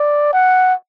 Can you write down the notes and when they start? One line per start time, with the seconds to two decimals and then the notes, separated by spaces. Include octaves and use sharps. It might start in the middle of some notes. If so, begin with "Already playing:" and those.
Already playing: D5
0.33 F#5